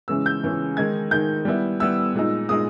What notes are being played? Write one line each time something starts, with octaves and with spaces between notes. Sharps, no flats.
C#3 E3 G#3 C#4 E6
G6
C#3 E3 G#3 C#4
D#3 G#3 D#4 G#6
D#3 G#3 D#4 G6
G3 B3 E4
G3 B3 E4 E6
A#2 G#3 D#4
A#2 G#3 D#4 D#6